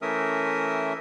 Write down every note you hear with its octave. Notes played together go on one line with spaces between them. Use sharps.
E3 A3 C#4 A#4 E5 D#6